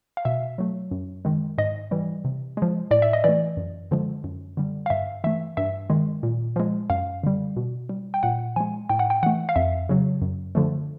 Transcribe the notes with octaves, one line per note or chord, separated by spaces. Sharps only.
F5
B2 E5
F#3 A3
F#2
D#3 G#3
G#2 D#5
E3 G3
C3
F3 G#3
A2 D5
E5
D#5
E3 A3 D5
F#2
D3 F3 G#3
F#2
D3 G3
F5
G2 E5
E3 A3 E5
G2 E5
D#3 G#3
A#2
F3 G#3
F#2 F5
D3 G3
B2
G3
G5
A#2 F#5
F3 G#3 G#5
A2 G5
F#5
G5
E3 A3 F#5
F5
F2 E5
C#3 F#3
F#2
D3 F3 A3